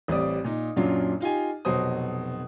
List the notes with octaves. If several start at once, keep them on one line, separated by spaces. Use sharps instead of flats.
A1 G3 C4 D5 D#6
A#2 D#4
F#2 A#2 F#3 C#4 D4 F4
D#4 F4 G4 G#5
F1 B2 F#3 C5 D#6